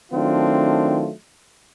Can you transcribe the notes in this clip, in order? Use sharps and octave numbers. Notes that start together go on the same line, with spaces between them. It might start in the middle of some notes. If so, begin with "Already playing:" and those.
D#3 F#3 A3 C4 D4 F4